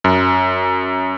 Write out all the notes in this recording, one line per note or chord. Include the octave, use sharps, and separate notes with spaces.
F#2